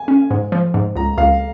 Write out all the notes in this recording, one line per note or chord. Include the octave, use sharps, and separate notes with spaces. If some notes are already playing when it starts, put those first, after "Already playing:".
Already playing: G#5
C#4
G#2
F3
G#2
C#2 A#5
C#2 F5